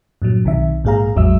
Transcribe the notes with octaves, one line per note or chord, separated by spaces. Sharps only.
G2 A#2 F#3
B1 C3 D#3 E5
A#1 G#2 A#3 G#4 F5 A#5
A1 E2 F#3 G#3 E5 E6